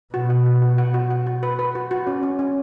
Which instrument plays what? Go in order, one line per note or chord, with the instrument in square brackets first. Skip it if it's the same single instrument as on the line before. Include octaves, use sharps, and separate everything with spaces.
[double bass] B2 [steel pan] F#4
[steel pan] F#5
F#4
F#4
F#5
F#4
F#5
F#4
B4
B4
F#4
F#4
C#4
C#4
C#4